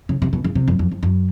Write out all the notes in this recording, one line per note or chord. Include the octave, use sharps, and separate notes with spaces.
C#3
C3
B2
C#3
C3
F#2
F2
F2
F#2